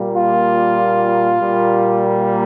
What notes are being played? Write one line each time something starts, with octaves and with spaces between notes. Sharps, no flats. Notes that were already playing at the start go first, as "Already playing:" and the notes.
Already playing: A#2 G3 A#3
F4
A#2 G3 A#3